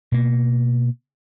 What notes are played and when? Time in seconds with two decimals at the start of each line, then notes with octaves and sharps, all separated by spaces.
0.12 B2 A#3